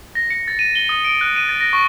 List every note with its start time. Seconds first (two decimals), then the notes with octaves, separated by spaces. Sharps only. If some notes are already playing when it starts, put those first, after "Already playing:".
0.15 A#6
0.30 C#7
0.48 A6
0.59 D#7
0.75 G7
0.89 D#6
1.04 D7
1.21 F#6
1.36 D#7
1.49 A6
1.61 A#6
1.73 C#6